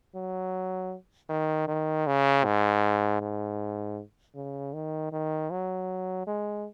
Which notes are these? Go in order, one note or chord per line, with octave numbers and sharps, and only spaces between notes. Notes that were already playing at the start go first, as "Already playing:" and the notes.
F#3
D#3
D#3
C#3
G#2
G#2
C#3
D#3
D#3
F#3
G#3